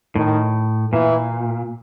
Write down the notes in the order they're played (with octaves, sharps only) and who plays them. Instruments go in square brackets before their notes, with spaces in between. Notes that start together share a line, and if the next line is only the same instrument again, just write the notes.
[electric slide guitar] A2 [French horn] D#3
[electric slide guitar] A#2 [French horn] E3